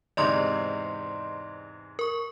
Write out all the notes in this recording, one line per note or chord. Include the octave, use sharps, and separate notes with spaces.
E2 G#2 C3 D5 D#5 C6
A#4 C#6